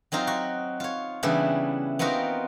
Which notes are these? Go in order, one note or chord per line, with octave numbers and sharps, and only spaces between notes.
F#3 C4 D#4 F4
F#4
F4 C#5
C#3 E3 G3 B3 D4 E4
B3 C4 D#4 F4 F#4 A#4